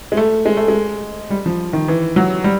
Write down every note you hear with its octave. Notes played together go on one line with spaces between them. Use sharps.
G#3
A3
G#3
A3
G#3
G3
F3
D#3
E3
F#3
G3